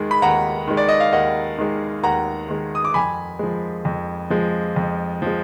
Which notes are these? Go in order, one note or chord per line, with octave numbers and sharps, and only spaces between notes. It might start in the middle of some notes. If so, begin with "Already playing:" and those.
Already playing: D#2 D#3 G#3
B5
D#2 F#5 A#5
D#3 G#3
D5
D#5
F5
D#2 D#5 F#5
D#3 G#3
D#2 F#5 A#5
D#3 G#3
D#6
D6
F2 G#5 B5
F3 G#3
F2
F3 G#3
F2
F3 G#3